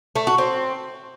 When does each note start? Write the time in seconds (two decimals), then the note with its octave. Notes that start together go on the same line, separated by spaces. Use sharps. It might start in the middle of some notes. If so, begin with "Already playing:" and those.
0.16 A3
0.27 F#4
0.38 C4